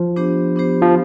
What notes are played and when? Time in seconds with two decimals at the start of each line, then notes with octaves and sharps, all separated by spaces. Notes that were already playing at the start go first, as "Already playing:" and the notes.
Already playing: F3
0.16 B3 D4 G4 C5
0.56 B3 D4 G4 C5
0.82 F3